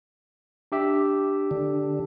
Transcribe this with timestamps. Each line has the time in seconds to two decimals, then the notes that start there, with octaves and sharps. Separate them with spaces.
0.72 D4 G4 E5
1.51 D3